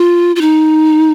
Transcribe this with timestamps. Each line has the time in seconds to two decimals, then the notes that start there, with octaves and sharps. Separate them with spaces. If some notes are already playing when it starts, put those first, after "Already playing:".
Already playing: F4
0.36 F4
0.41 D#4